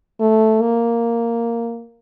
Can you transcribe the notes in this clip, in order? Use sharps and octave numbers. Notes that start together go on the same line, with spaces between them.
A3
A#3